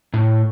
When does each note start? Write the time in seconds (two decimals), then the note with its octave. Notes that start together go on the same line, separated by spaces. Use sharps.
0.14 A2